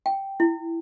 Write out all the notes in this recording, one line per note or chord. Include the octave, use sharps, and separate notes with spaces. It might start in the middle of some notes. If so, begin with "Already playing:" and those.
G5
E4